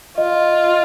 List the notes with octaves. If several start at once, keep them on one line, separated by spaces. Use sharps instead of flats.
F4 D#5